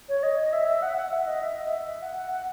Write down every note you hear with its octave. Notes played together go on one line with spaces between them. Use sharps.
C#5
D#5
E5
F#5
F#5
E5
D#5
E5
D#5
E5
F#5
F#5
F#5